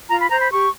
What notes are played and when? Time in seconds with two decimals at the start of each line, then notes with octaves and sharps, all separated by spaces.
0.09 F4 A#5
0.20 B5
0.30 C5 A#5
0.40 B5
0.51 G4 C#6